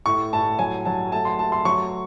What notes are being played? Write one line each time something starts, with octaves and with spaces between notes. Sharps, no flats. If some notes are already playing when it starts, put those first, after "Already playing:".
A2 C#6
A2 A5
F#3 G#5
F#3 A5
A3 A5
C6
A3 A5
C6
F#3 C#6